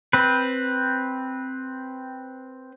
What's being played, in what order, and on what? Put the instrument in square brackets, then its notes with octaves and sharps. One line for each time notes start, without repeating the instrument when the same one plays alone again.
[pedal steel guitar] C4 B4